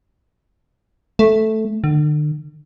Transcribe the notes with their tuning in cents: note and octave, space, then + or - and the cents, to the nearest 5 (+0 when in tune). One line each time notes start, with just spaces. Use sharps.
A3 -5
D3 +40